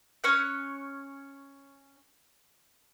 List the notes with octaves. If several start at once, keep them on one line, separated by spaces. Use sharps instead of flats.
C#4 C#5 F#6